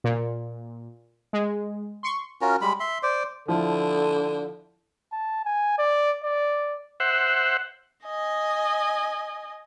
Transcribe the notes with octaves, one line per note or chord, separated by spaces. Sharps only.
A#2
G#3
C6 C#6
C#4 F4 F#4 A#4
G3 G#3 B5
E5 C6
C5 D5
D3 F3 E4 A4
A5
G#5
D5
D5
C5 E5 F#5
D#5 G#5